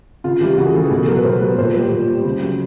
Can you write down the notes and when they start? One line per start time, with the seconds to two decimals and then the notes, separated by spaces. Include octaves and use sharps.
0.24 C#3 F4
0.40 E3 G3 G4
0.58 C#3 F#4
0.66 G#4
0.74 E3 G3 A4
0.83 G#4
0.91 B2 F#4
1.00 A4
1.08 F#3 A#4
1.17 B4
1.25 B2 C5
1.41 F#3 B4
1.58 A#2 C5
1.75 G3
1.91 A#2
2.08 G3
2.24 C#3
2.42 F#3